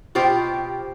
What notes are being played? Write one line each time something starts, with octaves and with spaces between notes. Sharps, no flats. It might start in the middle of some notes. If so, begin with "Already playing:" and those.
B2 F4 G4 C5 G5